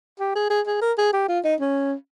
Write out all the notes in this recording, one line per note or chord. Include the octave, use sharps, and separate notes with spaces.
G4
G#4
G#4
G#4
A#4
G#4
G4
F4
D#4
C#4